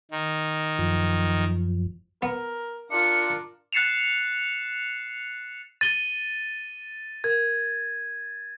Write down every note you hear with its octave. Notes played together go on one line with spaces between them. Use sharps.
D#3
F#2 F3
B3 A#4
D4 F4 A#4 C#7
F#6 A6 C7 C#7 E7 F7
A6 D#7 G7
A#4 G#6